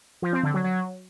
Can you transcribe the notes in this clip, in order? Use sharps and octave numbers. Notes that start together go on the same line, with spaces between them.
F3
C4
D3
F#3
F#3